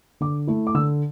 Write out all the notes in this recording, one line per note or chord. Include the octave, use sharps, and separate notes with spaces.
D3 D6
A3 E4
D6
D3 E6